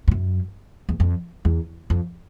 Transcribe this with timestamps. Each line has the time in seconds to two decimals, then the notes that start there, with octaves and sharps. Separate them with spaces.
0.08 F2
0.11 F#2
0.89 E2
1.00 F2
1.45 E2
1.90 F2